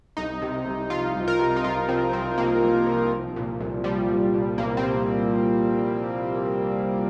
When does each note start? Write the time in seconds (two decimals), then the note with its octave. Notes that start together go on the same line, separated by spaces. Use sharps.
0.17 C2 D#4
0.42 C3
0.66 C2
0.90 F3 F4
1.16 C2
1.28 A#4
1.39 C3
1.56 D#4
1.64 C2 F4
1.89 F3 C4
2.12 C2 C4
2.37 C3 A#3
2.61 C2
2.86 F3
3.11 C2
3.36 A#2
3.60 C2
3.84 F3 G3
4.09 C2
4.34 A#2
4.58 C2 A#3
4.77 C4
4.83 F3